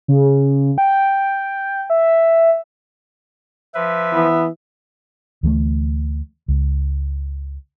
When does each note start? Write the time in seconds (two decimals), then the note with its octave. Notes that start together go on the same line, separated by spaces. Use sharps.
0.08 C#3
0.78 G5
1.90 E5
3.75 F3 B4 E5
4.13 E3 B3
5.43 D2 E3 G3 A3
6.48 C#2